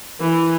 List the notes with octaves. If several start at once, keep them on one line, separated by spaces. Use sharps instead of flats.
E3